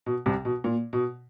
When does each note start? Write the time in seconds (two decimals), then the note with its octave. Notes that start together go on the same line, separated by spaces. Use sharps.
0.06 B2
0.26 C2 C3
0.45 B2
0.64 A#2
0.93 B2